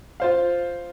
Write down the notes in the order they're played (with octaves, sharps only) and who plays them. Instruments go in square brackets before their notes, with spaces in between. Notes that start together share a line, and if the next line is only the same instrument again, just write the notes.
[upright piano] F4 C5 F5